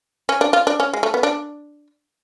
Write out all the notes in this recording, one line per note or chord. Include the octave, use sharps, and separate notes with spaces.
C#4
D4
F4
D4
C#4
G#3
A3
B3
D4